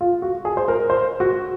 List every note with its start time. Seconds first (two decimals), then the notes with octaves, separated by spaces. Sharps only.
0.01 F4
0.22 F#4
0.45 G#4
0.57 C5
0.68 A#4
0.90 C5
1.20 F#4